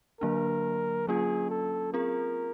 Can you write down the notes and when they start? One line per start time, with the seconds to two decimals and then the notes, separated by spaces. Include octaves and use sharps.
0.21 D3 F#3 A#3 D4 A#4
1.07 F#3 A#3 C#4 F4 G#4
1.50 A4
1.93 C4 F4 G#4 A#4